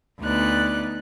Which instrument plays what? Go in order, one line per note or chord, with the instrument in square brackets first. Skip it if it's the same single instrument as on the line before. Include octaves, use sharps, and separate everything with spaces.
[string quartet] D2 B3 D#4 D5 F#6